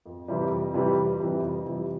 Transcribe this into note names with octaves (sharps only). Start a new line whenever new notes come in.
F2
C3 E3 G3
F2
C3 E3 G3
F2
C3 E3 G3
F2
C3 E3 G3